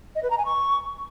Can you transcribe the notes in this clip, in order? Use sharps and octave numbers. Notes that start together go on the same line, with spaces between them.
D#5
B4
A#5
G#5
C#6